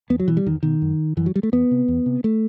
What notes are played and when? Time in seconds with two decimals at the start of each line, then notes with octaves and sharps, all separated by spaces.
0.10 E2 B3
0.20 F#3
0.28 B2 E3
0.37 G3
0.46 E2 D#3
0.63 B2 D#3
0.82 F#2
1.17 F#2 E3
1.26 F#3
1.36 G3
1.43 A3
1.52 E2 B3
1.71 C3
1.88 E2
2.06 C3
2.24 A3